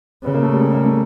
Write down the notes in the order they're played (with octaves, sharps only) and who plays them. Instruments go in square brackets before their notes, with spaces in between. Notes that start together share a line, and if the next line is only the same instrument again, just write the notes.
[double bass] C#3 [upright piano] B3
[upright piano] A#3
A3
G3
G#3
A#3
A3